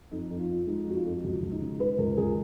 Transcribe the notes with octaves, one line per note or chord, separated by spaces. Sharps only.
F2 D#4
F2
F4
F3
G#3 D#4
F2 F#4
F4
F2
C#2 F#4
C#2
D#4
C#3
G#3 B4
C#2 A#4
C#2 G#4